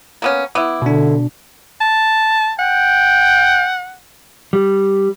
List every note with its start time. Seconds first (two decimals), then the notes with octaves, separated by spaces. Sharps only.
0.22 A#3 B3 C#4
0.55 B3 E4 D6
0.82 B2 D3 D4
1.81 A5
2.59 F#5 G5
4.53 G3